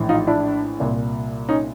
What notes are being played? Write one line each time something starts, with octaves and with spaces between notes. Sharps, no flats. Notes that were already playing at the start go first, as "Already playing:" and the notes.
Already playing: A#1 A2 E3
D#4 F4
D4 E4
C2 A#2
C#4 D#4